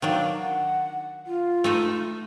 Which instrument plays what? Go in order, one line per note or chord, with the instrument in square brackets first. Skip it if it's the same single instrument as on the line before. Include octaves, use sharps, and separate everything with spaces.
[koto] D#3 F#3 D4 [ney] F5
[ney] F#5
F4
[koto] A3 D#4 A4